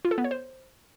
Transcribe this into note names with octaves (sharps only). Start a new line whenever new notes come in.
F4
A4
B3
C#5
C5